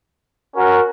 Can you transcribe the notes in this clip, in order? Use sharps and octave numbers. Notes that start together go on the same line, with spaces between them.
C#4 F#4 A#4